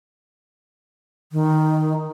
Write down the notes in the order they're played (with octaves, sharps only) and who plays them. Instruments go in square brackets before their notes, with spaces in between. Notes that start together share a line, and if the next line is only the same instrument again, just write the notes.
[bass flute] D#3